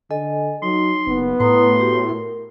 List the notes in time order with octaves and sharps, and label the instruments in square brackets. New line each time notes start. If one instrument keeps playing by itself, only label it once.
[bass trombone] D3 [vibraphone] A4 D#5 G#5
[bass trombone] F#3 [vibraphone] D#4 [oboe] C6
[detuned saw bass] F#1 [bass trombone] B3
[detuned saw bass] A2 [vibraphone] B4 A#5 D#6 [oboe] C6
[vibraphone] F#4 G4
A#4